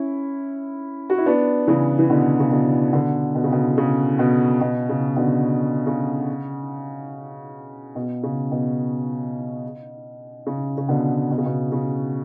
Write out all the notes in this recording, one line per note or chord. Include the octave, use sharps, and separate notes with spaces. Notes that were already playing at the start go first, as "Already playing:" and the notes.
Already playing: C#4 E4
F#4
E4
B3 D4
C#3 E3
E3
B2 D3
C#3
B2 D3
B2 D3
B2
C#3
B2
C#3
B2
B2
C#3
B2 D3
C#3
B2
C#3
B2
C#3
C#3
B2 D3
B2
C#3
B2
C#3